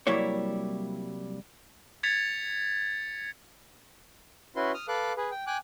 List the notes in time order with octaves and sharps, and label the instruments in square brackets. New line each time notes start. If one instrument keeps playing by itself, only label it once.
[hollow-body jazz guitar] C2 F#3 G3 A#3 E4 C#5
[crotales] G#6 A6 B6 C#7 F7
[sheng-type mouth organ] C#4 E4 F#4 B4 C6
D#6 F6
A4 B4 F5 D6 F#6
G#4 B4
G5
G5 G#5 D6 F#6